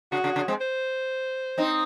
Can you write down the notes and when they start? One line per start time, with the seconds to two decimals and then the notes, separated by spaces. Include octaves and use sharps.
0.12 C#3 F#4
0.24 C#3
0.36 C#3
0.48 G#3 C4
0.60 C5
1.58 C4 D#4